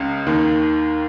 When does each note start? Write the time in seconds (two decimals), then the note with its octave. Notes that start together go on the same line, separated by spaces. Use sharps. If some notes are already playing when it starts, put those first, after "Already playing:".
Already playing: C#2 C#3
0.26 D#2 D#3